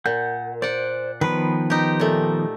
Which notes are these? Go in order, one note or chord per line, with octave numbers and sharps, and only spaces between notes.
A#2 F#5 G6
C5 D5 F#5
D#3 F3 B3 B4
D#4 G4
A#2 A3